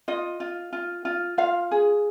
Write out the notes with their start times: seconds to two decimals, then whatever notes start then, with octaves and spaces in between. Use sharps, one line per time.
0.08 F4 D#5
0.40 F4
0.73 F4
1.05 F4
1.38 F4 F5
1.71 G#4